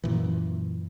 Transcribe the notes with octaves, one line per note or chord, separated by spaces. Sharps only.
F#2 A#2 E3